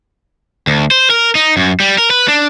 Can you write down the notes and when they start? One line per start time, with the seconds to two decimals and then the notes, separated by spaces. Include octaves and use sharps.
0.67 D2
0.91 C5
1.10 A#4
1.35 D#4
1.57 F#2
1.80 G3
1.98 A#4
2.11 B4
2.28 D4